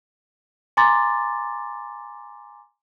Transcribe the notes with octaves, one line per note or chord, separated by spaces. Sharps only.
G#5 A#5 C6 D6 A6